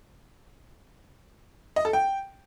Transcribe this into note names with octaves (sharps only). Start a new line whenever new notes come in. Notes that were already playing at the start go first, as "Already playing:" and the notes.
D#5
A4
G5